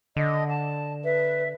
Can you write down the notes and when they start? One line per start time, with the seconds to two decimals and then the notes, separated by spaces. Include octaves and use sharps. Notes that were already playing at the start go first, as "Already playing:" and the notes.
0.16 D3 D#5
0.50 A5
1.04 B4 E5